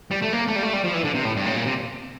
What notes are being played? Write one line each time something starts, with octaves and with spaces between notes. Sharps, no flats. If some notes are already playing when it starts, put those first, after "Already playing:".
G3
A3
A#3
A3
G3
A3
G3
F3
E3
D3
C3
A2
G2
A2
A#2
C3